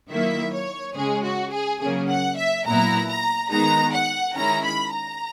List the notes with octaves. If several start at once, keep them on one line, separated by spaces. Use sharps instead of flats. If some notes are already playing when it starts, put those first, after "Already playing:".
D#3 F#3 A#3 E4 E5
C#5
C#3 G#3 C#4 G#4
F#4
G#4
C#3 F#3 A#3 C#4 G#4
F#5
E5
A#2 F#3 B3 E4 A#5
A#5
D#3 G#3 B3 D#4 A#5
F#5
D#3 G#3 C#4 E4 A#5
B5
A#5